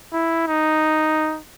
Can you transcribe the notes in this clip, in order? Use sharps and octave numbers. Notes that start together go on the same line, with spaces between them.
E4
D#4